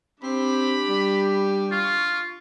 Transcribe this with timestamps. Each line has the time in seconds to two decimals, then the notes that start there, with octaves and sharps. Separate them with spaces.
0.23 C4 D4 G4 B5
0.89 G3
1.72 F4 C#6